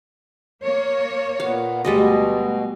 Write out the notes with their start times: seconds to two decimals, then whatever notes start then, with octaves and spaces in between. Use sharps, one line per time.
0.63 A#3 C#5
1.40 A#2 B3 F5
1.85 D2 B2 G3 G#3 D#5